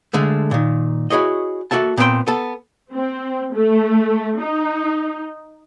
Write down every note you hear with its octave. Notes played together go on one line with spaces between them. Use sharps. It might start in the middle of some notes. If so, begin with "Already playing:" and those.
D3 G#3 A3
A#2 D#3
E4 F#4 G#4 C#5 D#5
A#3 F#4 A4 E5 A5
A#2 B3 C4 F#4 G5 C6
B3 A4 A5
C4
A3
D#4